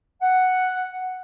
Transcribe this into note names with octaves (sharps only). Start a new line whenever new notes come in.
F#5